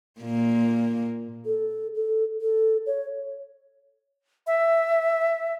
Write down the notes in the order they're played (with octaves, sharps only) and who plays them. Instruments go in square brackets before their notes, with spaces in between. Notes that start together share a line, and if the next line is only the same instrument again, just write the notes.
[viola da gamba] A#2 A#3
[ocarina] A4
A4
A4
C#5
[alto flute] E5